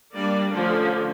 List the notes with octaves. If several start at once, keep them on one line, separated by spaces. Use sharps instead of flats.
G3 A#3 D4 D5
D3 F3 A3 C#4